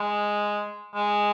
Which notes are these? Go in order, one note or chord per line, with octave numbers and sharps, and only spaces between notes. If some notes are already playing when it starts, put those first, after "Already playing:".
Already playing: G#3
G#3